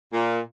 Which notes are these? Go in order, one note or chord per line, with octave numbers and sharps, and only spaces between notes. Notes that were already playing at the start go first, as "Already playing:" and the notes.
A#2